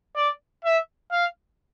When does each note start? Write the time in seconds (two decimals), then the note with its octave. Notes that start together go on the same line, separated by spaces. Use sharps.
0.16 D5
0.65 E5
1.11 F5